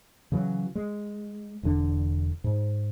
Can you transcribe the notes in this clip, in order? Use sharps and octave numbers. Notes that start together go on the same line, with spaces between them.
C#3 E3 F#3
G#3
E1 E2 D3 D4
G#2